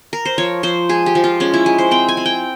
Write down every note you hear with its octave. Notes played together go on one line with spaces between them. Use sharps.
A#4
C5
F3 C#5
F3 C5
G#3 G#4
G4
F3
F4
G#3 C#4
E4
G#3
C5
C4 G5
G#5
C4
G5